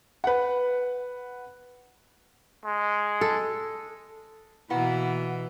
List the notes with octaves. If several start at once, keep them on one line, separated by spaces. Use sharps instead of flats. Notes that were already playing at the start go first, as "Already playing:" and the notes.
B4 F#5
G#3
A4
B2 E3 A#3 B3 E4 F#5